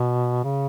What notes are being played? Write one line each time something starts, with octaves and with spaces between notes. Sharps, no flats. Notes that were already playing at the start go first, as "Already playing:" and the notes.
Already playing: B2
C#3